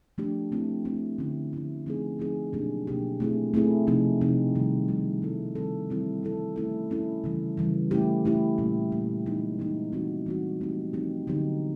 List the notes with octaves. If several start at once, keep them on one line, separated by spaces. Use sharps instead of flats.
F3 A3 D4 G4
A3 C4 E4
A3 C4 E4
D3 F3 A3 C#4 E4
D3 F3 A3 C#4 E4
F3 A3 C4 D#4 G#4
F3 A3 C4 D#4 G#4
B2 F#3 A#3 D4 G4
B2 F#3 A#3 D4 G4
A3 C4 E4 G#4
A3 C4 E4 G#4
C3 F3 A3 C4 D#4
C3 F3 A3 C4 D#4
C3 D#3 G3
C3 D#3 G3
D#3 G3 C4 E4 A4
D#3 G3 C4 E4 A4
E3 G3 C4 E4 A4
E3 G3 C4 E4 A4
A3 C#4 E4 A4
A3 C#4 E4 A4
C#3 E3 G3
C#3 E3 G3
A3 C#4 E4 G4
A3 C#4 E4 G4
A#2 G3 A#3 C#4
A#2 G3 A#3 C#4
E3 G#3 B3 D#4
E3 G#3 B3 D#4
E3 G3 C4 D#4 F#4
E3 G3 C4 D#4 F#4
F3 A3 C4 D#4 G4
F3 A3 C4 D#4 G4
D3 F#3 B3 D#4 G4